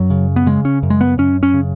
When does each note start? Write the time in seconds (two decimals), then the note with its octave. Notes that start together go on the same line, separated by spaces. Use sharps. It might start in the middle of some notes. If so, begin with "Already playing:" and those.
Already playing: F#2 F#3
0.10 C#3
0.36 B3
0.46 C#3 G#3
0.65 C#4
0.83 F#2
0.90 G#3
1.01 B3
1.18 F#2 C#4
1.43 C#4
1.54 C#3